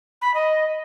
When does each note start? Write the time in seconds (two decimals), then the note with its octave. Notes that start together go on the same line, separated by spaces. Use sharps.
0.22 B5
0.34 D#5